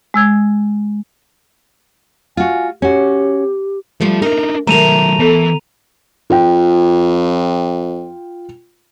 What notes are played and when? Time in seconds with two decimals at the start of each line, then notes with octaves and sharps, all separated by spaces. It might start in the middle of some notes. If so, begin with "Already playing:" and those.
0.14 G#3 E6 G#6
2.37 F4 F#4 G#5
2.82 C#4 F#4 G4
4.00 F3 G3 A3 F4
4.22 D4 D#4 A#4
4.67 D#3 F#3 A3 A#4 A#5 D#7 F7
5.19 E3 B3 A4 B5
6.30 F2 F4 G5